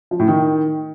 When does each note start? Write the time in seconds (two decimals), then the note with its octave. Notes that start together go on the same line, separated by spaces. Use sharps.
0.11 F3
0.19 A2
0.28 D#3